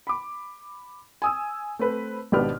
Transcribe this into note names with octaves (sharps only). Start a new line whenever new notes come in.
B5 D6
G#5 D#6 E6
A3 C4 B4 C5
G#1 B2 D4 G4 B4 F6